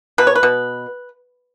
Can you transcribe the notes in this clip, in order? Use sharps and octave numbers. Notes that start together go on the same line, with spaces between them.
B2 B4
C#5
B4
B2